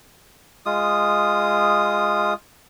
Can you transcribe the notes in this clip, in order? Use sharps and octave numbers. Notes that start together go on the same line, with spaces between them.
G#3 F4 D#6